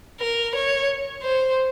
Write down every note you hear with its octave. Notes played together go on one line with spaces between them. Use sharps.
A#4
C#5
C5